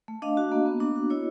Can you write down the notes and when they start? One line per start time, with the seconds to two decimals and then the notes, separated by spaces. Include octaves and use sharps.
0.08 A3
0.22 D4 D#5 F5
0.37 F#4
0.52 A#3
0.66 B3
0.80 D4
0.96 F#4
1.10 E4 C#5 D#5